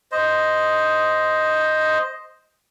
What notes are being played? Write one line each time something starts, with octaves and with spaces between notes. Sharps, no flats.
C5 D#5